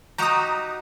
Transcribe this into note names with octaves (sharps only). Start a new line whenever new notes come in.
D#4 F#4 G4 A#5 D#6